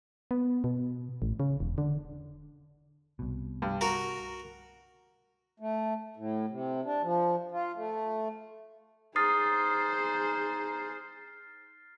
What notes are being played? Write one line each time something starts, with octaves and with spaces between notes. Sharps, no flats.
B3
B2
A1
C#3
E1
D3
C2 B2
G2
F#4 A#4 A#5
A3
A2
C3
D4
F3
F4
A3
D#4 G#4 C5 D#6 F6 A6 C7